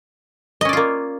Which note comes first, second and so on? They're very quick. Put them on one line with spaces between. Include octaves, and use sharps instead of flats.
D#5 C#4 D5 F4 A#3